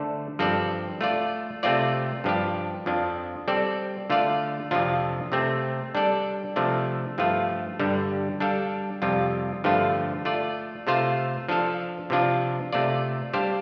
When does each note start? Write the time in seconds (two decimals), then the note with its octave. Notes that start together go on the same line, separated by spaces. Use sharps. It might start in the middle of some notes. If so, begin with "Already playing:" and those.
Already playing: D3 A3 D4 A4 C5
0.39 G2 F3 C4 A4 D5
1.01 A3 F4 D5
1.63 C3 A3 C4 F4 D5
2.24 G2 F3 D4 G4
2.86 F2 F3 D4
3.48 G3 C4 A4 D5
4.10 D3 A3 F4 D5 F5
4.71 F2 C3 F3 D4 F4
5.32 C3 A3 C4
5.95 G3 D4 A4 D5
6.56 C3 F3 A3 D4
7.18 G2 F3 A3 F4
7.80 G2 D3 G3
8.40 G3 D4 A4 F5
9.02 F2 C3 G3 F4
9.64 G2 D3 F3 A3 F4
10.25 A3 F4 D5
10.87 C3 A3 F4 C5 F5
11.48 F3 D4 A4 F5
12.10 C3 F3 D4 F4
12.73 C3 A3 F4 D5
13.33 G3 D4 G4 C5 F5